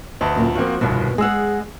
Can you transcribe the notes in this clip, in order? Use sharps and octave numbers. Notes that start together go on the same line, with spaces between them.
D2 B4 D#5 A5
F#2 A#2 A#3
F3 A#3 C4 F4 F#4
G1 C2 F2 B2 D#3
G#3 G#4 F#5 E6